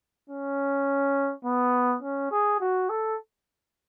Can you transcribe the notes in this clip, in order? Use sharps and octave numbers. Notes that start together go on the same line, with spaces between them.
C#4
B3
C#4
G#4
F#4
A4